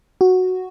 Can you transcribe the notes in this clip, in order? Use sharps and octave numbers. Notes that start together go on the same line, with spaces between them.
F#4